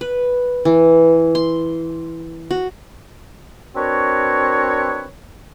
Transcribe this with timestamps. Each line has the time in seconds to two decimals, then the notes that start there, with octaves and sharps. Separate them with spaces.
0.01 B4
0.65 E3
1.35 C6
2.51 F#4
3.75 C4 D4 F#4 A#4 B4 C#5